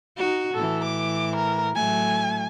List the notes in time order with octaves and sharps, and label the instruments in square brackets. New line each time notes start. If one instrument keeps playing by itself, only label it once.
[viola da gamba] D#4 F#4
[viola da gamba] A2 E3 [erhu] A4
[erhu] D6
A#4
[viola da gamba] A2 F#3 A3 [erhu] G#5